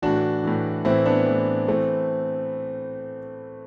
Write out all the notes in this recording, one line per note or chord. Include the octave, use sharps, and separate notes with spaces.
A2 E3 D4 F#4
A2 E3
A2 E3 C4 E4
B3 D4
A2 E3
A2 E3 A3 C4